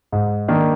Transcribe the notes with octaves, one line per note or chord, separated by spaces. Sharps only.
G#2
D#3 A#3 D4